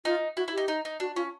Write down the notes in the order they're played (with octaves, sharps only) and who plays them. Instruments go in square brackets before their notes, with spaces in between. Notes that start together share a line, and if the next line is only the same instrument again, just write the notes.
[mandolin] D#4 [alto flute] F4
[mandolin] E4 [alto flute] F#4
[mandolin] E4
[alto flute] G4
[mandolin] D#4
D#4
D#4
[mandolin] D4 [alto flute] F#4
[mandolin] C#4 [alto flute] F4